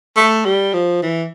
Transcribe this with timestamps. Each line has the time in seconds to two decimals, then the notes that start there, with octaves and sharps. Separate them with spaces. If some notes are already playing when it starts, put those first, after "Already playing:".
0.17 A3
0.45 G3
0.73 F3
1.02 E3